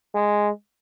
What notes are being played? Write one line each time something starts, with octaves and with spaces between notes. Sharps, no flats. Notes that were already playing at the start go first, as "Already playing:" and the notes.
G#3